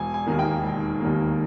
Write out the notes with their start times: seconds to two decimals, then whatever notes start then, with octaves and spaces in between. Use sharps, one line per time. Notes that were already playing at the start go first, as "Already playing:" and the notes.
Already playing: E1 G#5
0.14 G#5
0.27 D#2 D#3 A#3
0.39 G5
0.63 E1
1.00 D#2 D#3 A#3